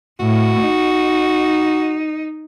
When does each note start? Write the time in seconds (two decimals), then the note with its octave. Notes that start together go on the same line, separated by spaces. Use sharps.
0.20 A2 F#4
0.62 D#4